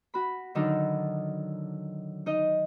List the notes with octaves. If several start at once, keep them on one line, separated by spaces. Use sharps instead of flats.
F#4 B5
D3 D#3 F#3 D4 D#4
D#4 D#5